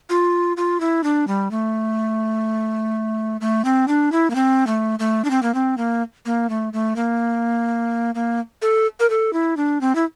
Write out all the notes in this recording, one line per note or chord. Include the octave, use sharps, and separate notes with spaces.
F4
F4
E4
D4
G3
A3
A3
C4
D4
E4
A#3
C4
A3
A3
D4
C4
A#3
C4
A#3
A#3
A3
A3
A#3
A#3
A4
A#4
A4
E4
D4
C4
E4